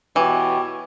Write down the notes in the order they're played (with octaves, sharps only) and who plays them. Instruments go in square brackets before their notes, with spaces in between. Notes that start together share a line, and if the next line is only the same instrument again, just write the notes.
[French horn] B2 [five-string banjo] E3 [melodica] G4 C#5